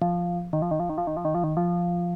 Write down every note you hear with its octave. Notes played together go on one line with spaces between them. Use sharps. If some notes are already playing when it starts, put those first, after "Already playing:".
F3
D#3
F3
D#3
F3
D#3
F3
D#3
F3
D#3
F3
D#3
F3